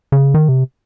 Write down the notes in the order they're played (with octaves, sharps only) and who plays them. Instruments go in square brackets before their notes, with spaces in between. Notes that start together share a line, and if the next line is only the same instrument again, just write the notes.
[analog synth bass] C#3
D#3
C3